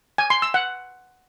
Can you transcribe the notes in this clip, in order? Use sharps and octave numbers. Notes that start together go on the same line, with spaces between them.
G#5
C6
E6
F#5